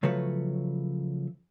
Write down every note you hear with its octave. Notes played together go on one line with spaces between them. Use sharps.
C#3 F3 F#3 A3 B4 C#5